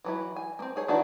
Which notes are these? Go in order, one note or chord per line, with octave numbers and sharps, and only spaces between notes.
E3 F#3 E4
G#5
A#3 C4
D#4 G#4 C#5
D#3 E3 D4 E4 F#4